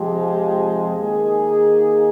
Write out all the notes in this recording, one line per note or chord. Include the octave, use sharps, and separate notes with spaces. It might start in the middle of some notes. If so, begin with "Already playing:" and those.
Already playing: F2 C3 F3 G#3 C4 G4
D#3 A#3 D#4 G#4